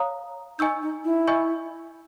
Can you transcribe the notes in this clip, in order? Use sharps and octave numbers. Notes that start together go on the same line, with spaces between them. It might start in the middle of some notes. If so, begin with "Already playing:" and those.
Already playing: C#5 F5 A#5 D#6
D#4 D#5 G#5 C#6 E6 G6
D#4
E4
D#5 G#5 C#6 E6 G6